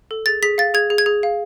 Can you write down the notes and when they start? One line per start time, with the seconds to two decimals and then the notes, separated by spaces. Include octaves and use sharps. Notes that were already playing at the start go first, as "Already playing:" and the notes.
0.11 A4
0.26 G#4 A6
0.42 G#4 B6
0.58 F5 A6
0.74 G#4 G#6
0.90 G#4
0.98 G#6
1.06 G#4
1.23 F5